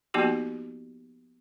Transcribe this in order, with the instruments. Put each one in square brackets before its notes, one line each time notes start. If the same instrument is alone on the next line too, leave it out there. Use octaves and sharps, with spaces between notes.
[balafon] F3 A#3 B3 D#4 F#4 G4